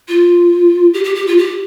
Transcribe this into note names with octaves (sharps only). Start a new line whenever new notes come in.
F4
G4
G4
G4
F4
G4